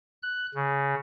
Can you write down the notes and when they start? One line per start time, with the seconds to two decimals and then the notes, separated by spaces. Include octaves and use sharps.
0.23 F#6
0.55 C#3